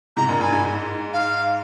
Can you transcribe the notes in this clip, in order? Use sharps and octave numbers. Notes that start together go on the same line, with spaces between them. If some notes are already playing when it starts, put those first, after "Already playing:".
G#2 C3 A#5
G2 A#2
G2 G#5
G#2
G#2
F5